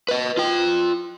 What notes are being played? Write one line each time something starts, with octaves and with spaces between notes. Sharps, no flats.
B4 D#5
F4 G5